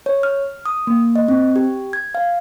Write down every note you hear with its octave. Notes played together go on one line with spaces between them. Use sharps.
C#5
F6
D#6
A#3
D#5
C4
G4
G#6
F5